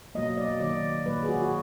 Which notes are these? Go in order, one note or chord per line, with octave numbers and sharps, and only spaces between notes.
B2 F#3 A#3 D#5
D5
D#3 F#3 A#3 D5
A#2 F#3 A#3 B4
G#4
F#4
F#4